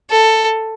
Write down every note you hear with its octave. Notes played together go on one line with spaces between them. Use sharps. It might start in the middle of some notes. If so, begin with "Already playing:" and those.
A4